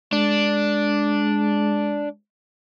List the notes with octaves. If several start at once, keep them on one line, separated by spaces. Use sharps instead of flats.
G#3 D4